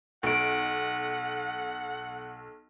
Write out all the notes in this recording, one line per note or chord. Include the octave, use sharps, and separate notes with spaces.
B1 F#5 D7